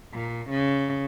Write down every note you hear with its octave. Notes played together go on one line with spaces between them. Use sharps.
A#2
C#3